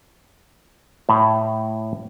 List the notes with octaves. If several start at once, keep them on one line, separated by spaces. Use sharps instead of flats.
A2